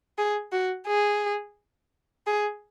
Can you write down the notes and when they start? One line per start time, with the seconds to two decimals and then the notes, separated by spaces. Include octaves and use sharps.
0.18 G#4
0.53 F#4
0.87 G#4
2.27 G#4